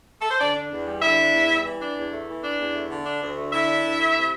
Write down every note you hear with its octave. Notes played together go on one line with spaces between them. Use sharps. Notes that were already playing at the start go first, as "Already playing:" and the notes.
A4
C5
D3 D4 D5
D4
E2
G3
D3 E4 E5
D4
E2
G3
E3
D4
E2
A3
E3
D4
E2
A3
D3
D4
D2
A3
D3 E4 E5
D4
D2
A3
C3